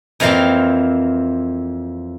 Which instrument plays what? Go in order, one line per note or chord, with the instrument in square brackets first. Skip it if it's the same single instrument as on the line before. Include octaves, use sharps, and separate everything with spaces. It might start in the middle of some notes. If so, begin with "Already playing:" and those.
[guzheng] F2 E3 A#3 C4 F5 C6